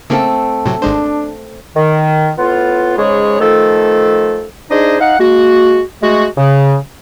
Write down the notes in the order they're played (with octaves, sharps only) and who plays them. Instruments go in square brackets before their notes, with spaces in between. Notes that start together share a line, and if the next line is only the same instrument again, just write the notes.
[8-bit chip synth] C#3 A#3 [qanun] A3 C4 A4
[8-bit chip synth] A2 C3 F#3
[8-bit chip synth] G#1 G#3 C5 [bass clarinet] D4
[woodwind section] D#3
A2 B3 F4
G#2 C#3 G#3 G#4 C#5
D#3 F3 A3 A4
D4 D#4 G#4 C5 D#5
D#4 F5 F#5
G#3 A#3 F#4
G#3 A3 F#4
C#3